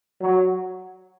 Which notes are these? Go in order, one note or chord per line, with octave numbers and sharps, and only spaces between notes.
F#3